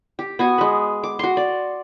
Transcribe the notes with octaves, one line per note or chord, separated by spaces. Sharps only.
G4
B3 F#4 G#5
G#3 B4
D6
F#4 C6
D5